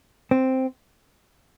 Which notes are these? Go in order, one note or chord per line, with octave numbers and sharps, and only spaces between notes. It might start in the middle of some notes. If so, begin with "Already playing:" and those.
C4